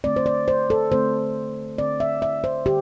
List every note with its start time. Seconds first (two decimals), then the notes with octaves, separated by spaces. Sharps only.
0.04 D3 A3 C4 D5
0.16 C5
0.26 D5
0.48 C5
0.70 A4
0.92 D3 A3 C4 C5
1.78 D3 C4 D5
2.00 E5
2.22 E5
2.44 C5
2.66 D3 G4